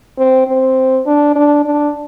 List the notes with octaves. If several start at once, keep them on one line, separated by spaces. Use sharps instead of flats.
C4
C4
D4
D4
D4